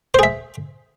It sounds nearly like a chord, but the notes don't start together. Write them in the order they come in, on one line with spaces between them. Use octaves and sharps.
C5 G#4 E5